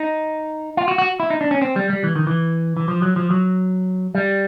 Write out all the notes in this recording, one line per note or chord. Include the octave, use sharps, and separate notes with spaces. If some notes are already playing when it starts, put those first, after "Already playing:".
Already playing: D#4
F4
F#4
F#4
E4
D#4
D4
C#4
C4
G3
G3
E3
D#3
E3
E3
F3
F#3
F3
F#3
G3